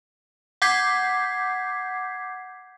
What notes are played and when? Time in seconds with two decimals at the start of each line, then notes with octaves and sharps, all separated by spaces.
0.62 F#5 D6 G6 G#6 B6 C7